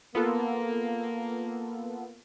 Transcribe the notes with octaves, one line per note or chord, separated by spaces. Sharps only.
A#3 B3 F4 A4